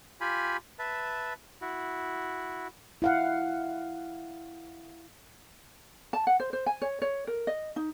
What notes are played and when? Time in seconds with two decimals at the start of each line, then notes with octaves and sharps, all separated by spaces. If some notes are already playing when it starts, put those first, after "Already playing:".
0.21 F4 G4 G#5 B5
0.79 B4 E5 A5
1.62 E4 F#4
3.02 E4 F5 F#5
6.13 A5
6.27 F#5
6.40 C5
6.53 C5
6.66 G#5
6.82 C#5
7.02 C#5
7.27 A#4
7.47 D#5
7.76 D#4